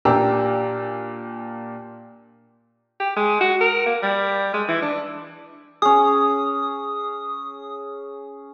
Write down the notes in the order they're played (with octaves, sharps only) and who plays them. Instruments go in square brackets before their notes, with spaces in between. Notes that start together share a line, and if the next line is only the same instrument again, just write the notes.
[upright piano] A#2 D4 G4 A#4 A#5 E6
[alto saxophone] G4
G#3
F#4
A#4
A#3
G3
G#3
E3
D4
[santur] C#4 G#4 [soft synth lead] D#6